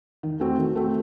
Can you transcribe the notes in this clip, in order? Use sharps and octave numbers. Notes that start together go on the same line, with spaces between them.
D#3
A3 C4 F#4
D#3
A3 C4 F#4